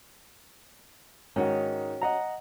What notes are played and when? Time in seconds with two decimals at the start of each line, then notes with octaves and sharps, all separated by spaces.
1.36 G#2 D#3 C#4 F#4
2.02 D#5 F#5 A#5